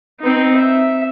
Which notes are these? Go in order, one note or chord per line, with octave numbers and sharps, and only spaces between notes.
C4 D#4
E5